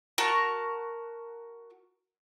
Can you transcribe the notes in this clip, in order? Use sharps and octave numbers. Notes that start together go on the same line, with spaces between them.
F#4 A#4 A5 C#6